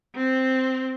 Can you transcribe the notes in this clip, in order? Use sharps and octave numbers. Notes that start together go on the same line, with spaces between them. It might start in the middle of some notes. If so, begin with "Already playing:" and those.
C4